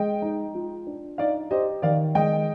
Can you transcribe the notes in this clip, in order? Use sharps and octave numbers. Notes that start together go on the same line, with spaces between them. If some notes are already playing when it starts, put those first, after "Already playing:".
Already playing: G#3 D#5 G5
D#4
F4
D4
D#4 D5 F5
G4 C5 D#5
D#3 D5 F5
G#3 D#5 G5